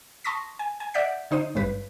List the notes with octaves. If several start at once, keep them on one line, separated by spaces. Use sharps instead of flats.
A5 C6 C#6 D#6 A#6 B6
G#5
G#5
D5 E5 F#5 G6 B6
D3 D#4 C5 D#7
G#1 G2 B4